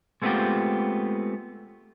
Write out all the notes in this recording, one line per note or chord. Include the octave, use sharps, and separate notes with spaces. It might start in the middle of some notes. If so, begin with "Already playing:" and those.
G#3 A3 B3 C4 F4 G4